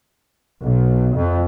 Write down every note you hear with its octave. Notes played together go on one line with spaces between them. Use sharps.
B1
F2